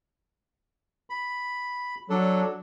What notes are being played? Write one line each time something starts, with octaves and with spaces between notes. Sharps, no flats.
B5
F#3 D4 A4